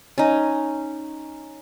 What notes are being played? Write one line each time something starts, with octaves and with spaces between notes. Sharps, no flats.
C#4 D#4